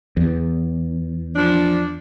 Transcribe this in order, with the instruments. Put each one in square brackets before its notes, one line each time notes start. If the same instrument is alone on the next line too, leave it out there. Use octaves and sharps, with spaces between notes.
[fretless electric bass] E2
[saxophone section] F3 D4